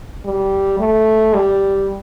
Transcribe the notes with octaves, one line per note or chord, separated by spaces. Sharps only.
G3
A3
G3